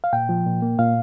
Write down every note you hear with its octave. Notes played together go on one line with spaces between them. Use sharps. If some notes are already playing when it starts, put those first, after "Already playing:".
F5
A#2 G5
F3
A#2
A#3
A#2 F5